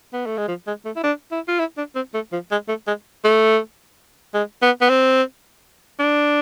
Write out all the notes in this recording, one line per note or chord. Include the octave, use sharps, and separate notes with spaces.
B3
A3
G#3
F3
G#3
A3
E4
D4
E4
F4
E4
D4
C4
A3
F3
G#3
A3
G#3
A3
G#3
B3
B3
C4
D4